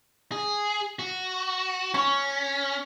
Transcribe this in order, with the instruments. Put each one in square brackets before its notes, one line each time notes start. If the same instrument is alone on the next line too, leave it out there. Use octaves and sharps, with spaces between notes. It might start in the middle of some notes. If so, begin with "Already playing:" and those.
[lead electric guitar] G#4
F#4
[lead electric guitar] C#4 [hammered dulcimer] C#6